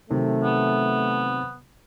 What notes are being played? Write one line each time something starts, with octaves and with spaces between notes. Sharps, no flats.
C3 D#3 F#3 A3
B3